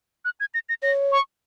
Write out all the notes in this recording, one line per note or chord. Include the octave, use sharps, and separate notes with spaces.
F#6
G#6
A#6
A#6
C#5 A#6
C#6